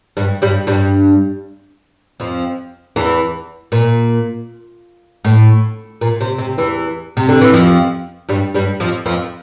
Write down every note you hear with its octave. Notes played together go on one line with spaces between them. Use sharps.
G2 G3
G2 G3
G2 G3
F2 F3
E2 E3
A#2
A2
A#2
C3
C3
E2 E3
C3
D3
E3
F2 F3
G2 G3
G2 G3
F2 F3
F2 F3